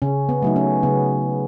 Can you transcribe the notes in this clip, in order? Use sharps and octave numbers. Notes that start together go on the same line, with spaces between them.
C#3 C#4
B3
F#3 A3 D#4
C#4
C#3 B3